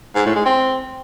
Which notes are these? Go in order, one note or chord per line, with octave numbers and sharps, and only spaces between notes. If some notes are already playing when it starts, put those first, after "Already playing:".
G#2
A2
G#3
C4